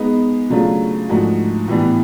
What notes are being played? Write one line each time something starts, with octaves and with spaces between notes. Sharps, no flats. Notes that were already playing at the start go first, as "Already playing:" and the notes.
Already playing: G#3 B3 D#4
C#3 F#3 A3 D4 F4
G#2 F3 A3 D4 F#4
A2 E3 G3 B3 D4